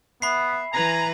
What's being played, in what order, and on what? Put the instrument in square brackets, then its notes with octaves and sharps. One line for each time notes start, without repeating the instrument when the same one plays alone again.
[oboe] B3 [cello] E5 [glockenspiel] B5 C7
[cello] E3 B4 [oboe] G#5 [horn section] A#5